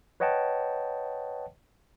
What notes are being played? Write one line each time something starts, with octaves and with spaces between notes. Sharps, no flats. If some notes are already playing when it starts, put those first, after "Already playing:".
B4 C#5 D#5 F#5 G5 A5